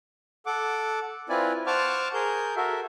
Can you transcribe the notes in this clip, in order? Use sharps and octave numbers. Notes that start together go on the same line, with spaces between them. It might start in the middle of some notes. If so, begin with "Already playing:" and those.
A4 F#5 D6
C4 E4 F4 B4 D5 G#5
C5 F#5 A5 C#6 D6 F6
G#4 A#4 G6
F#4 A4 A#4 E5